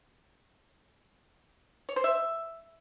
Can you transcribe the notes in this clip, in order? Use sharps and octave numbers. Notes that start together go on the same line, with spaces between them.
C#5
C5
E5